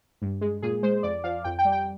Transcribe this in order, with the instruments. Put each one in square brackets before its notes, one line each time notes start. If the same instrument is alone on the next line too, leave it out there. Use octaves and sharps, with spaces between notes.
[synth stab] G2
G#3
A#2 G#4
G#3 C5
F2 D5
F3 F5
F2 G5
G5
G3
G5